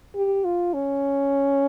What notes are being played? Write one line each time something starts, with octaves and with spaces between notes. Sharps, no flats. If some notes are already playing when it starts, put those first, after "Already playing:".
G4
F4
C#4